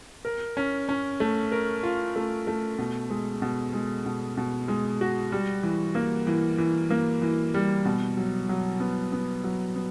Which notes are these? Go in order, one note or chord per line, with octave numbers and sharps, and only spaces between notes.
A#4
C#4
C#4
A3
A#4
F4
A3
A3
B2
G#3
B2
G#3
B2
B2
G#3
F#4
G3
E3
A#3
E3
E3
A#3
E3
G3
B2
F#3
F#3
B3
B3
F#3
B3